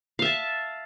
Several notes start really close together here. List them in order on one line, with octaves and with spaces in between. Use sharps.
F5 E5 A5